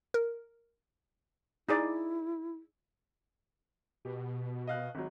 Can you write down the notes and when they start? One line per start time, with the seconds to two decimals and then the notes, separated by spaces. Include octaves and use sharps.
0.14 A#4
1.69 D#4 E4 G#4 D5
4.05 B2 G4
4.67 D#5 F5 F#6
4.95 G#1 F#3